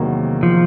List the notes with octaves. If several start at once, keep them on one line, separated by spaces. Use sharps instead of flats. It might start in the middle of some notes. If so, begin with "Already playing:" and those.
Already playing: E2 C3 D#3 F#3 A#3
F3